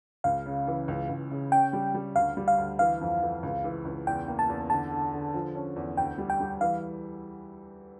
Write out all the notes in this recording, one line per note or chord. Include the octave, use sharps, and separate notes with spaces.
C#2 F5
C#3
E3
C#2
C#2
C#3
C#4 G5
G3
G3
D2 F5
G3
F5
D2
E3 F5
F2
E3
C#2
E3
C#2
E2 G5
A#3
A5
E2
D3 A5
D3
D3
F3
C#4
E2
D2 G5
G3
G5
G3
E3 F5